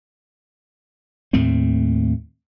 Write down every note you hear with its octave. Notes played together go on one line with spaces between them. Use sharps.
D#2 A2 A3 C4